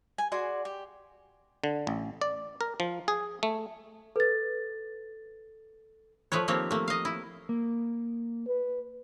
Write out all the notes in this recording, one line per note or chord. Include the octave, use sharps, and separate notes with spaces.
G#5
F#4 G#4 D5 C6
G4
D3
A1
D5
A#4
F3
G#4
A3
A4 B4 A6
F3 A3 B4 C#5
D#3 F3 A#3 C4 G4 C#5
A3 A#3
D#5 F5
E4
A#3
B4